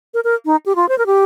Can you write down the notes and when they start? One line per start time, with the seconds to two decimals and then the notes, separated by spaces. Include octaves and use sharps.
0.14 A#4
0.24 A#4
0.46 D#4
0.66 G4
0.76 F4
0.89 C5
0.98 A#4
1.06 G4